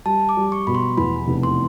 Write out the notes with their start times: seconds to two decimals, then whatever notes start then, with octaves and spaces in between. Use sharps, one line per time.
0.05 G3 A5
0.29 D6
0.37 G3
0.52 C#6
0.67 B2 B5
0.75 C6
0.97 E2 B5
1.28 F1
1.43 C6